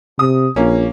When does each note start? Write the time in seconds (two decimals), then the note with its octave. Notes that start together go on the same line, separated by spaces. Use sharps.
0.19 C3 D#6
0.56 A#1 A#3 C#4